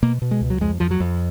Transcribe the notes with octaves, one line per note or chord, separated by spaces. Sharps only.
B2 A#3
B2
G#3
C#2
F#3
F2 G#3
F2 F3
F#3
F2